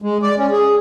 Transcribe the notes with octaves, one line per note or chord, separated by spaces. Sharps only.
G#3
D5
C#4
G#4